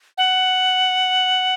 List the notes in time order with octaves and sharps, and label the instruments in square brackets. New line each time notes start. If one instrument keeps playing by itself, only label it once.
[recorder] F#5